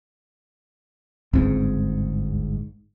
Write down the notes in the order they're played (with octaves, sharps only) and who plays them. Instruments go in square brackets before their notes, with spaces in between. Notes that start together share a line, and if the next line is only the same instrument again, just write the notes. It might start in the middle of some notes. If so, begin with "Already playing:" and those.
[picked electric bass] G1 G#2 [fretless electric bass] C#2 C4